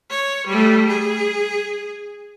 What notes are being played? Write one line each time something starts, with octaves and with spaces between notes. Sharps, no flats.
C#5
G3 A3
G#4